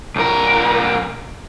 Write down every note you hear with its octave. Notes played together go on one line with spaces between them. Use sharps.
B1 A#4